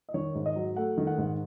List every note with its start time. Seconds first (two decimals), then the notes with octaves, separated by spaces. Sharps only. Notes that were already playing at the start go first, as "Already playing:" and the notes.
0.09 D#5
0.14 D#3 C#5
0.35 G#2
0.46 D#5
0.56 F#3
0.76 A3 F#5
0.98 D#3
1.07 F#5
1.18 G#2